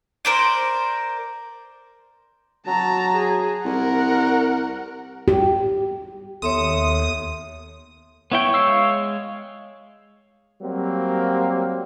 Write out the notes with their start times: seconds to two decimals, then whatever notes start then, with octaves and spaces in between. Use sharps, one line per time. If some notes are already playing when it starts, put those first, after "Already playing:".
0.25 A#4 C5 D5
2.67 F#3 A5 A#5
3.16 G#4
3.65 C2 A#4 F#5
5.28 G4
6.42 D#2 B3 A4 C#5 E5 C6 D#6
8.32 B3 E4 C#5 G5
8.54 G#3 F5 E6
10.62 F#3 G3 A#3 C4